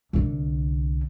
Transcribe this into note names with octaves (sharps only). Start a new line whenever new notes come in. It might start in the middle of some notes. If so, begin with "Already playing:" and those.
C2 D3